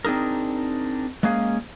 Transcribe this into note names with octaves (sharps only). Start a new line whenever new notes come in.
C4 D4 D#4 G#4 A#4
G#3 A#3 C#4 G#4 F5